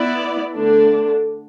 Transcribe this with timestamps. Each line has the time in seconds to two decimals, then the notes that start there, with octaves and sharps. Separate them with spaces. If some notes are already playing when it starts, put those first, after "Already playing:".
Already playing: B3 E4 D5
0.53 D3 A3 D4